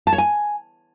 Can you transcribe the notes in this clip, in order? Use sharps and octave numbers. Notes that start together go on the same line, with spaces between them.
A5
C#5
G#5